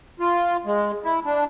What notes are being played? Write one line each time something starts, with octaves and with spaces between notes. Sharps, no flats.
F4
G#3
E4
D4